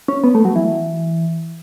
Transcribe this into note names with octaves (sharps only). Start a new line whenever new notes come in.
C#4
B3
A3
F#3
E3